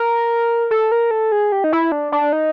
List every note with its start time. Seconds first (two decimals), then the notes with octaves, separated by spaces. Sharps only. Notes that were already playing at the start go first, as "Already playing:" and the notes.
Already playing: A#4
0.71 A4
0.92 A#4
1.11 A4
1.32 G#4
1.52 G4
1.64 D#4
1.72 E4
1.92 D4
2.12 D4
2.33 D#4